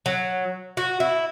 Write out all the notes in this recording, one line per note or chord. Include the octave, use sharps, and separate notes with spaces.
F#3
F#4
E4